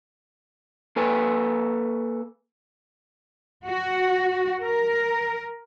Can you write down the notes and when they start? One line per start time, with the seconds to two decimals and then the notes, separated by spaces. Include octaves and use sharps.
0.96 A#3 A4 B4 G#5
3.67 F#4
4.62 A#4